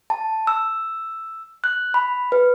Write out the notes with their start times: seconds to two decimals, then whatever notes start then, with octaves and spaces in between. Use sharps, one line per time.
0.10 A5
0.47 E6
1.64 F#6
1.94 B5
2.32 B4